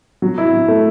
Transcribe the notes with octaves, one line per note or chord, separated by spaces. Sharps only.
F#3
E4
F#3
A3